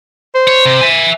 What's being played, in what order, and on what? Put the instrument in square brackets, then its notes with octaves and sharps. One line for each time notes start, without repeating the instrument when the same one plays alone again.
[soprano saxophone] C5
[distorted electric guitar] C#5
C3
E5 G#5